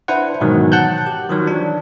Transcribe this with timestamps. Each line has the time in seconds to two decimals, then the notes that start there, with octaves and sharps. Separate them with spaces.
0.08 D4 E4 B4 C5 F#5
0.41 G#2 B2 D#3 E3 F#3
0.72 F#5 A5 F#6 G6
1.07 G4
1.29 D#3 F3 F#3
1.47 E3 D4